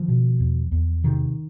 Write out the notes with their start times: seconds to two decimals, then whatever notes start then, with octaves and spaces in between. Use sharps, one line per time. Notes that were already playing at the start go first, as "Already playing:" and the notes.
Already playing: D#3 F3
0.08 B2
0.40 E2
0.72 E2
1.04 C3 D#3